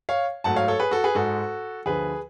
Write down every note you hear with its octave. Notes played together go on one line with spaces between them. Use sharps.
C#5 F5
G#2 F#3 A3 F#5 A5
C#5 F5
A4 C#5
G#4 B4
F#4 A4
G#4 B4
G#2 G#3 F#4 A4
D2 D3 F3 G#4 B4